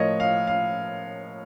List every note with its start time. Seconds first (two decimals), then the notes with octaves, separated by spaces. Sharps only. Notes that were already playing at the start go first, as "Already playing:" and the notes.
Already playing: A2 F3 A#4 C#5 D#5
0.20 F5
0.47 F5